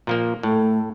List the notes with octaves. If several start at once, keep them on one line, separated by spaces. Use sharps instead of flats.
A#2 F3 A#3
A2 A3